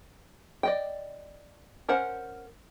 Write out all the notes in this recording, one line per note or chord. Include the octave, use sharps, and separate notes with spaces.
D5 D#5 G5
C#4 A#4 C5 F#5